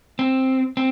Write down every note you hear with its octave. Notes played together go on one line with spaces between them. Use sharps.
C4
C4